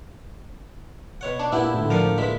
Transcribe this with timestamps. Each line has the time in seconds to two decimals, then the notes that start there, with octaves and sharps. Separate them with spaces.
1.21 B2 C#5 F#5
1.39 D4
1.52 A#2 B3 D4 E4 G4 F#5
1.74 A2 D3
1.90 F3 A#3 D5 F#5
2.18 A#2 E3 G#3 B6